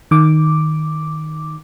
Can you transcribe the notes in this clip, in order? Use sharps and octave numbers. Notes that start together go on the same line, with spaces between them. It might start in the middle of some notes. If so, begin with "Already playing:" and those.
D#3 D6